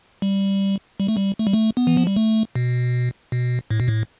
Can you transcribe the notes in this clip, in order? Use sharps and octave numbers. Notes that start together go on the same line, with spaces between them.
G3
G3
A3
G3
A3
G3
A3
B3
E3
F3
G3
A3
B2
B2
A2
B2
A2